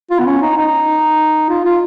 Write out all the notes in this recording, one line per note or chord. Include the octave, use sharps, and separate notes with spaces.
F4
B3
C#4
D#4
D#4
F4
F4